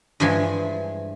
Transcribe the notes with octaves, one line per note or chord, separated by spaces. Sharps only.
G2 E3 F3 G#3 G#5